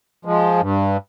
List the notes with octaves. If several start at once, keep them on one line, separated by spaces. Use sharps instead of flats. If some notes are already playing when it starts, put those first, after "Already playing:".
F3 G#3
G2